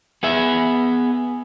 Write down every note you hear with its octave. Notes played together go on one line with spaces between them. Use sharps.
B3 G#4 E5